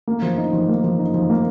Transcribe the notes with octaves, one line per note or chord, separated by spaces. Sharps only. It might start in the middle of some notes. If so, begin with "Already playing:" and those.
A#3
F3
D#4
F3
A#3
F3
D#4
F3
A#3